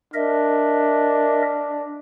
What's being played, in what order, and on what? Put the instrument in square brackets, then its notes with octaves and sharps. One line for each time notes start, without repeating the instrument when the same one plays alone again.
[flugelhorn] D4 [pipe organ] A#4 D#5 E5